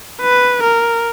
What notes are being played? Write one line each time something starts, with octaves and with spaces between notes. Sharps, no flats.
B4
A#4